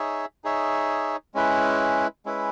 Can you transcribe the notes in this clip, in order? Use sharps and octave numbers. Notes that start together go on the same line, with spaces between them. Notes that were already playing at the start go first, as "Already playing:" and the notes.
Already playing: D#4 G#4 C#5 E5
D#4 G#4 C#5 E5
G#3 C#4 E4 B4
G#3 C#4 E4 B4